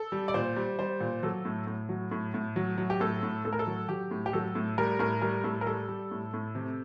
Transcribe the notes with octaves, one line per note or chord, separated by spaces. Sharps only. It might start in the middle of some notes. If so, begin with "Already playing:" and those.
Already playing: A4
G3
D5
A#2 C5
G3
G3 C5
A#2
F#3 A4
A2
A2
F#3
A2
A2
F#3
F#3
G4
A2 A4
A2
A2 A4
A#4
A4
F#3
F#3 G4
A2
G4
F#3 A4
A2
G3 A#4
A2 A#4
G3 A#4
A2 A4
A#4
G3 A4
G3
A2
A2
C3